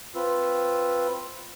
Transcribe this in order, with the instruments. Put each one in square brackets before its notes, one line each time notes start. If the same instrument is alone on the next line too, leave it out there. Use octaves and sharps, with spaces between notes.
[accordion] C4 F4 B4 E6